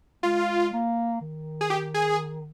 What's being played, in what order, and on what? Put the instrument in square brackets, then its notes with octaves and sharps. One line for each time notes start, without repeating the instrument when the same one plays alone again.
[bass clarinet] G#3 [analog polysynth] F4
[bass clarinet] A#3
D#3
[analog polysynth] G#4
G4
G#4